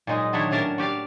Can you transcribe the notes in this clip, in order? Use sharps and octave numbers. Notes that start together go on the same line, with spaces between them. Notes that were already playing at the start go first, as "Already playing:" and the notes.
A#2 F#3 G#3 D#4
D#3 F#3 D4 E4 C#5
A2 C#4 D4 A#4 A5
F#4 G4 D5 F5